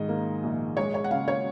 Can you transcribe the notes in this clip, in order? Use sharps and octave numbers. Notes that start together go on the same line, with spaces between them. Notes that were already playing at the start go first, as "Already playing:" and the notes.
Already playing: G#2 D#3 D#5
A#3
A#1
G#3 C#5
C#5
F#5
C#3 F5
C#5